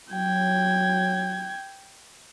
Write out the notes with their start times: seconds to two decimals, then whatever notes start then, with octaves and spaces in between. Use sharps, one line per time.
0.13 F#3 G5 G#6